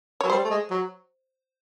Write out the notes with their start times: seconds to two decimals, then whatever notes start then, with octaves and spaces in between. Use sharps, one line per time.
0.21 F#3 C#5
0.30 G3 C5
0.44 A3
0.50 G#3
0.70 F#3